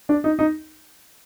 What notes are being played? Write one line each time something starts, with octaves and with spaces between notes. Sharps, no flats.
D4
D#4
D#4